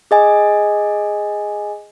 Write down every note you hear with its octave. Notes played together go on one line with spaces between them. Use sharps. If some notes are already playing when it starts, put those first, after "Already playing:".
G#4 D#5 G#5